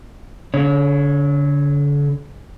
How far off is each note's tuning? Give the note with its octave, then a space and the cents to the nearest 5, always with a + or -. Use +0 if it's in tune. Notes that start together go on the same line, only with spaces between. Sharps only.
D3 -35 C#5 +0